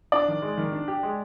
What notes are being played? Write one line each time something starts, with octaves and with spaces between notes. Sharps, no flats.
D4 D5
D#3
G#3
D#3
D4
G4
G#3